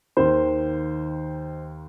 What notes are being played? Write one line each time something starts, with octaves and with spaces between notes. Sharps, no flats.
D#2 D#3 C5